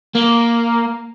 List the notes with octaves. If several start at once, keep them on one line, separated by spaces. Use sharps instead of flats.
A#3